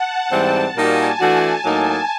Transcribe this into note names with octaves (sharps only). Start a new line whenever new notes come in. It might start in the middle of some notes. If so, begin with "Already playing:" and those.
Already playing: F#5 A5
G#2 E3 G3 C4
A#2 G3 A#3 D#4 F#4 G#5
E3 A3 D4 F#4
A2 F#3 A#3 D#4